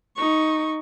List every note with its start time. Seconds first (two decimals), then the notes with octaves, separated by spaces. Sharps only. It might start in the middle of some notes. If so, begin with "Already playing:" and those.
0.16 D#4 C#6